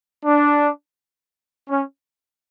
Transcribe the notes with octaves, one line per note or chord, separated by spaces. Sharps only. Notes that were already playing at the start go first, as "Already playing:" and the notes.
D4
C#4